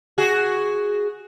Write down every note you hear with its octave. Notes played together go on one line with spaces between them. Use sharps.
F#4 G#4